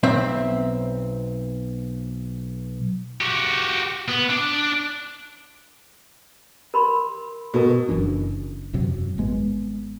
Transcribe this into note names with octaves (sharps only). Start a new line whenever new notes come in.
B1 C4 E5
F#4 G4
B3
D4
A#4 B5 C6
B2 A4 A#4
F#1 F#2 E3 D4
E1 F#2 C3 F#3
G#1 G#3 B3